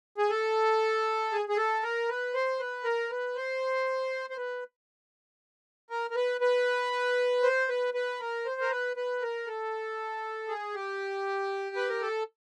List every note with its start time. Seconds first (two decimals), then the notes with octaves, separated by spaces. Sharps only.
0.18 G#4
0.30 A4
1.32 G#4
1.49 G#4
1.57 A4
1.83 A#4
2.09 B4
2.34 C5
2.60 B4
2.84 A#4
3.10 B4
3.36 C5
4.30 C5
4.37 B4
5.90 A#4
6.11 A#4
6.16 B4
6.41 B4
7.43 C5
7.69 B4
7.94 B4
8.20 A#4
8.45 C5
8.61 A#4
8.71 B4
8.97 B4
9.22 A#4
9.47 A4
10.48 G#4
10.74 G4
11.76 B4
11.89 A#4
12.02 A4